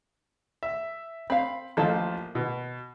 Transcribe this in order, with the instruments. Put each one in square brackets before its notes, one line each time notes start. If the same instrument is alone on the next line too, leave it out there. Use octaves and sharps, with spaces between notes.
[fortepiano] E5
[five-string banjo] C4 F5 [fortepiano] B5
[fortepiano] A1 F3 A5 [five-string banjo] A#3 A4 D#5
[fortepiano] B2